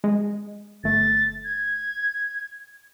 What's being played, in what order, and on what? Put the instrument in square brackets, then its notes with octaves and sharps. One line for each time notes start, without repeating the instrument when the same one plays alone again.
[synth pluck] G#3
[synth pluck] G1 A3 [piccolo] A6
[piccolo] G#6